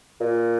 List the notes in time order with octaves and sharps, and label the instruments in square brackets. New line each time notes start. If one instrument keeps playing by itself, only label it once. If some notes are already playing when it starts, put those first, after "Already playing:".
[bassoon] A#2